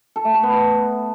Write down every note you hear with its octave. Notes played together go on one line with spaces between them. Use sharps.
A4
A3
A4
B3